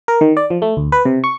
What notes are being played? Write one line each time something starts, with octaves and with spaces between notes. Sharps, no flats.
A#4
D#3
D5
F3
A3
D2
B4
C3
C#6